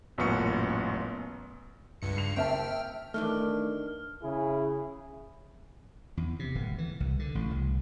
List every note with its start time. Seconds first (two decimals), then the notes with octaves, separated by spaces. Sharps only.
0.18 A1 F#2 A#2 B3 C#6 C#7
2.02 C#2 G2 C#7
2.17 C7 F7
2.36 F#1 E5 G5 A5 F6
2.51 E5
3.14 D#3 E3 A3 D4 F6
4.23 C#3 E4 G#4
6.17 E2
6.39 C3
6.55 D1
6.78 E3
7.00 C2
7.19 D3
7.35 A1
7.51 C2